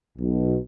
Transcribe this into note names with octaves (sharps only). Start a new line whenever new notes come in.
B1 B2